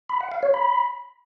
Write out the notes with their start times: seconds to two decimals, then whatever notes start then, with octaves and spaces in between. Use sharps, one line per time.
0.09 B5
0.20 F#5
0.32 F5
0.43 C#5
0.54 B5